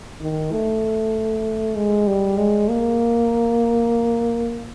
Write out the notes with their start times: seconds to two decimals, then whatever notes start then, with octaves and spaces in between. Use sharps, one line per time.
0.21 D#3
0.52 A3
1.76 G#3
2.07 G3
2.38 G#3
2.69 A#3